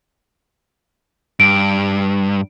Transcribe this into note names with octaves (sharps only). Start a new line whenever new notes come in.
G2 D7